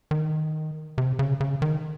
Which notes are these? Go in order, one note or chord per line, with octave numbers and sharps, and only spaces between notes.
D#3
C3
C#3
C#3
D#3